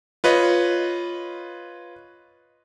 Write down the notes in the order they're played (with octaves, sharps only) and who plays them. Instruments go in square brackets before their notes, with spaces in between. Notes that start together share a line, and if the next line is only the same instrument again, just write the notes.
[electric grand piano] F4 B4 C#5 D#5